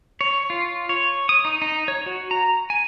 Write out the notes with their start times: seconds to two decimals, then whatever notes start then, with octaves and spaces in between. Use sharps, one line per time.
0.21 C#5
0.50 F4
0.89 C#5
1.29 D#6
1.45 D#4
1.62 D#4
1.88 C#5
2.06 F#4
2.31 A#5
2.70 G#5